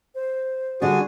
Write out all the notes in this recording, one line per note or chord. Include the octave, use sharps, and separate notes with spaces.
C5
D3 G3 D4 F#4 G#4